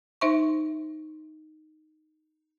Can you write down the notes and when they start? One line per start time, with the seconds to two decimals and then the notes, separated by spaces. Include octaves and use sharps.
0.21 D#4 C5 E5 C6 C#6